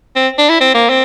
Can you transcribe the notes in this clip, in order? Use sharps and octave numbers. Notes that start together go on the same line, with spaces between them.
C4
D4
E4
C4
A#3
C4